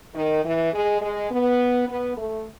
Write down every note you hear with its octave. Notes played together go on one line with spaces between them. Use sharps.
D#3
E3
G#3
G#3
B3
B3
A3